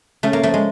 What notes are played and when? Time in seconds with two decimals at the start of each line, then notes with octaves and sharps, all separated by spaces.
0.23 C#3 A3
0.33 A#3
0.43 F3 A3
0.54 G#3